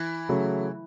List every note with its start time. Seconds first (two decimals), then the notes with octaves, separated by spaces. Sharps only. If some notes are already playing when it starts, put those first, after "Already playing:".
Already playing: E3
0.29 C#3 F#3 A3